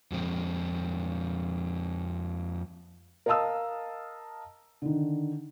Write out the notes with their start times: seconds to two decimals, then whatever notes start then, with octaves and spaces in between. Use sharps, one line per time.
0.12 F2 G#3 C4
3.26 A#4 D#5 F5 A5 D#6 E6
4.82 D3 D#3